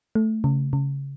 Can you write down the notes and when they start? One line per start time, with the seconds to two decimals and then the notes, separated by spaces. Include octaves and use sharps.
0.15 A3
0.44 C#3
0.73 C#3